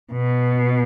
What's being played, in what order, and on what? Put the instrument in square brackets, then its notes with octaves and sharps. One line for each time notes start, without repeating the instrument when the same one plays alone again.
[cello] B2